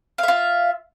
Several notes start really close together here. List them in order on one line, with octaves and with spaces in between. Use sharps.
F5 E5 F4